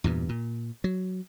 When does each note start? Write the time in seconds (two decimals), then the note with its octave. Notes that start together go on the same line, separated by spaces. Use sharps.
0.04 E2 G2 A#2
0.29 A#2
0.84 F#3